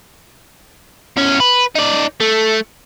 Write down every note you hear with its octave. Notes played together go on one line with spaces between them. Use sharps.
E2 C#4
B4
D#4 D5
A3